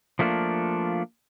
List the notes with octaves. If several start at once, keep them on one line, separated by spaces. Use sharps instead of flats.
F3 A3 A#3 D4 F4